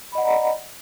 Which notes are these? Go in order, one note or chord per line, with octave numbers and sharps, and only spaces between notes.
D5 D#5 F#5 A#5 B5